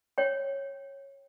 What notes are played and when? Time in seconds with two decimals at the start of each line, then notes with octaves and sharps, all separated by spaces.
0.18 C#5 G5